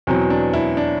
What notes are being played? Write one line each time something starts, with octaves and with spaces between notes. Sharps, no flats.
E2 B2 F#3 C4
D4
E4
D4